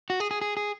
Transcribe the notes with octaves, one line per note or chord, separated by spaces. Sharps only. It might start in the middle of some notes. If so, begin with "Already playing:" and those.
F#4
G#4
G#4
G#4
G#4